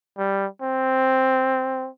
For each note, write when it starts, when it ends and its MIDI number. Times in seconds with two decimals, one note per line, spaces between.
0.18 0.47 55
0.62 1.89 60